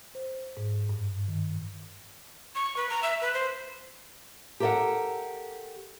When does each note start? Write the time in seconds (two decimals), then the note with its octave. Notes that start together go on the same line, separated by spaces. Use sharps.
0.15 C5
0.57 G#2
0.89 G2
1.28 D#3
2.55 C#6
2.77 B4
2.89 A#5
3.03 E5
3.21 B4
3.34 C5
4.60 G4 A4 A#4 D#5 E5 F#5